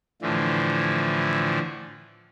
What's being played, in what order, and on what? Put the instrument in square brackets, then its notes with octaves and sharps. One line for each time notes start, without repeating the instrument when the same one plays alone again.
[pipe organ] A2 D3 E3 F3